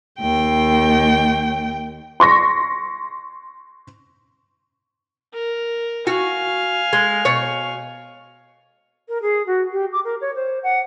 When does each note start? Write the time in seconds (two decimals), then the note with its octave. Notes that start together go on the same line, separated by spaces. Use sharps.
0.21 D#2 G5
2.20 C6 C#6 A#6
5.33 A#4
6.07 F#4 F5 G#5
6.93 G#3
7.25 B2 C#5
9.09 A#4
9.22 G#4
9.47 F#4
9.72 G4
9.93 D6
10.05 A#4
10.21 C#5
10.35 C5
10.63 F#5